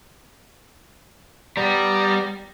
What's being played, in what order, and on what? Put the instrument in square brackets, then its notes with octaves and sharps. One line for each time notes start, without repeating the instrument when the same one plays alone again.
[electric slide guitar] G3 [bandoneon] B3 D5 A#5